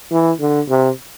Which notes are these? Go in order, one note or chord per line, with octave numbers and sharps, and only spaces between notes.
E3
D3
C3